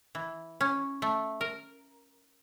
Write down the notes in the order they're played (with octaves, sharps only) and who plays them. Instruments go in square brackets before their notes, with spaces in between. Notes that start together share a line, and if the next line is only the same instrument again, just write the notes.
[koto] E3
C#4
A3
A#4